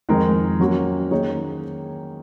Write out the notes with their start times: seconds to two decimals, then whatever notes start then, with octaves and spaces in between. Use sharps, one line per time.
0.09 F2 D#3 G#3 D#4 A#4
0.60 F#3 A#3 C#4 F#4
1.11 D#3 A#3 D#4 G#4 C#5